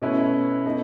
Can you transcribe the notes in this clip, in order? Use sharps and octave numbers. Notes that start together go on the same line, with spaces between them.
B2 A3 C#4 E4 B4
B3 D#4 A4